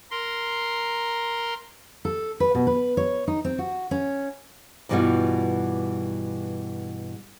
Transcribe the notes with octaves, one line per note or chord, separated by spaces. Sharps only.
A#4 C6
A4
B4
B2
B4
C#5
D#4
C4
F#4
C#4
G2 B2 E3 G3 F4 F#4